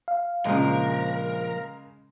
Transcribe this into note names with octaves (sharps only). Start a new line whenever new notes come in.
F5
A#1 C#3 F3 G#3 A#4